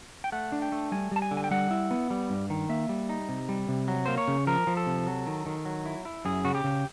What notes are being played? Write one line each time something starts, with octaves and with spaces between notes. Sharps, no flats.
G5
A3 F#5
D4
G5
A3
G3 G#5
G3 A5
G#5
D3
G#5
G5
G3 F#5
E4
B3
G3
G2
D#3
A#3 E5
G3
D#4
C3
G3
C3
F#3
A#3 C5
C#5
C#3
F3 A#4
F3
A4
C3
F#3
D#3
D#3
F#3
E4
E4
F#2 G#4
C#3 F#4
G4
C#3